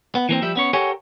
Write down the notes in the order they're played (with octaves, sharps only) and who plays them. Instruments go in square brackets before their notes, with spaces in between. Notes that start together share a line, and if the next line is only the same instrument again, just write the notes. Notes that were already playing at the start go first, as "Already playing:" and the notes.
[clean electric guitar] B3
E3 A#3 C4
F3 G3 G4 E5
B3 C#4 C#5
G4 A4 A#4 C#5 F#5 G#5